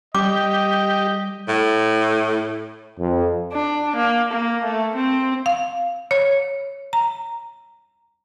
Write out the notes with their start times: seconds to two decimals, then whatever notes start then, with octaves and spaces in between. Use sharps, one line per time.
0.15 G3 G4 D#5 D6
1.48 A2
3.00 F2
3.53 D4
3.96 A#3
4.32 A#3
4.64 A3
4.95 C4
5.46 F5
6.11 C#5
6.93 A#5